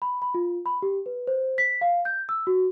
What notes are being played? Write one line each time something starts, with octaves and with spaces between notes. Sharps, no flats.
B5
B5
F4
B5
G4
B4
C5
B6
F5
G6
E6
F#4